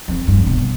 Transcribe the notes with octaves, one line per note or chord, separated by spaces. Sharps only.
F2
G2
B2